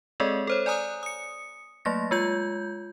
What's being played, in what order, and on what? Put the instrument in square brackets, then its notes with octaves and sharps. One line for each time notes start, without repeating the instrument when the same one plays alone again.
[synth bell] G#3 C4 G#4 A4 D5 D#5
A4 C5 C#5
D5 G#5 A#5 D#6 F#6
D#6 C#7
F#3 A3 A#3 A6 A#6
G#3 F4 G6